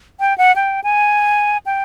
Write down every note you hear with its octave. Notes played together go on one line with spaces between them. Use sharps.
G5
F#5
G5
G#5
G5